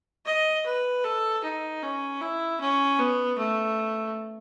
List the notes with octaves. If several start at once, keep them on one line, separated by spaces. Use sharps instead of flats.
D#5
B4
A4
D#4
C#4
E4
C#4
B3
A3